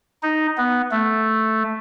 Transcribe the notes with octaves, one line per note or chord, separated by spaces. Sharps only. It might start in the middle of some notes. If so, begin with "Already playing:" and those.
D#4
B3
A3